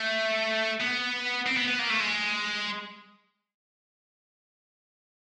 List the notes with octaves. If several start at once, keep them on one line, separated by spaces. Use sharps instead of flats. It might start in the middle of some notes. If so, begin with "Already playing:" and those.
Already playing: A3
B3
C4
B3
B3
A#3
A3
G#3